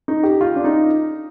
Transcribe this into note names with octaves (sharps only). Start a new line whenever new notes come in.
D#4
G4
F4
D4
D#4